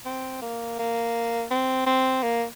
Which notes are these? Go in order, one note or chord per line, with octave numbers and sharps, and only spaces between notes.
C4
A#3
A#3
C4
C4
A#3